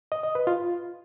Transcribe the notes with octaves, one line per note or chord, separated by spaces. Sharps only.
D#5
D#5
B4
F4